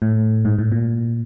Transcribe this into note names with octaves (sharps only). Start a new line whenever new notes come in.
A2
G#2
A2
A#2